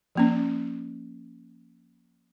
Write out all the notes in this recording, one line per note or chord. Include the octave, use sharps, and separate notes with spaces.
F3 A#3 C#4